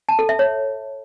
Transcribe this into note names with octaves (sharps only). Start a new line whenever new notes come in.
A5
A4
E5
C#5